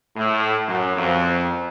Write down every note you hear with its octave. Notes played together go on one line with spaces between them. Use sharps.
A2
F#2
F2